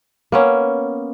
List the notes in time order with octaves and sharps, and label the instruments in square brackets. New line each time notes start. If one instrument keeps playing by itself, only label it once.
[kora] A#3 B3 C#4